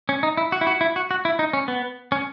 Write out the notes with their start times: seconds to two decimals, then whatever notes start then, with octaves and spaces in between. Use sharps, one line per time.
0.09 C#4
0.23 D#4
0.37 E4
0.52 F#4
0.61 E4
0.67 F#4
0.81 E4
0.96 F#4
1.11 F#4
1.25 E4
1.39 D#4
1.53 C#4
1.68 B3
2.12 C#4